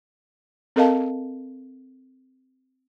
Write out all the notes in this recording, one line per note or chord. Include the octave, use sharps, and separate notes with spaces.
C4 A4 A#4 D#5 F5 A5